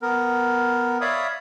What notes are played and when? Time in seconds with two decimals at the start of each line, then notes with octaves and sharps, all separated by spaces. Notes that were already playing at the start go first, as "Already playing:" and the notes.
0.02 B3 A#4
1.01 C#5 D5 E5 F5 B5 D#6